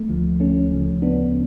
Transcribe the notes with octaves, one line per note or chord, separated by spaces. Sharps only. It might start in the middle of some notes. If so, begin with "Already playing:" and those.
Already playing: A3
D2 D3 F3
A3 C#4
D2 C#3 F3
B3 D4